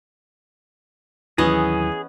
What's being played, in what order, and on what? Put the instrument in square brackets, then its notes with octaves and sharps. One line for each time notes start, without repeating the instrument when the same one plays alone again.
[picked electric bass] D#2 D#3 F#3 [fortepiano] E3 [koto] B3 C#4 D#5 [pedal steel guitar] G#4